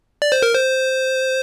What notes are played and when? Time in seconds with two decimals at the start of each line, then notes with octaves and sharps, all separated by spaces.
0.22 D5
0.32 C5
0.42 A#4
0.54 C5